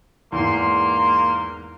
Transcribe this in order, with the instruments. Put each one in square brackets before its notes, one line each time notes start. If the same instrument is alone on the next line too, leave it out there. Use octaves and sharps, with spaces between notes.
[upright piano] E2 G#2 [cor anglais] A#3 [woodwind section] C6